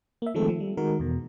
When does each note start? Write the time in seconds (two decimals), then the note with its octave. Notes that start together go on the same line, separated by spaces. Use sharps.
0.22 A#3 E5
0.34 D#3 F3 G#3 A3 C4 A4
0.49 F3
0.60 G3
0.77 D#3 G#3 F#4 A#4
0.99 E2 B2